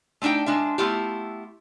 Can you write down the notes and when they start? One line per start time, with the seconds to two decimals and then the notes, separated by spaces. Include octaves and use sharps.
0.22 A3 C4 D4 D#4 G5
0.46 G#3 D4 F4 E5
0.78 A3 B3 E4 F4 G4